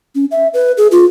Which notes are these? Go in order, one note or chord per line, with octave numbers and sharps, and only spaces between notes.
C#4
E5
B4
G#4
F4